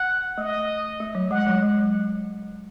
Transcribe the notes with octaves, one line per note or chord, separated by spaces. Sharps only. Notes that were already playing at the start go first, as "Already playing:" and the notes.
Already playing: F#5
A3 D#5
A3
F#3
G#3 F#5
F#3
G#3